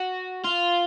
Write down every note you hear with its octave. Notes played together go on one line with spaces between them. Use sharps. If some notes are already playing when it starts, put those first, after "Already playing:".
Already playing: F#4
F4